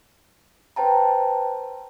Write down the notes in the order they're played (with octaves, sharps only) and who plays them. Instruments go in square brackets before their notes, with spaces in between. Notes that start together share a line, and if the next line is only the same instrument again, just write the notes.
[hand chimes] B4 C5 G5 A5 A#5